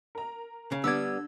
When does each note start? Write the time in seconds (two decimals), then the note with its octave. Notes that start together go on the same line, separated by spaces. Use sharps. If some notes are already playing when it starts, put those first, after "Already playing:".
0.15 A#4 A#5
0.72 C#3
0.84 D3 G3 B3 D4 E6 G#6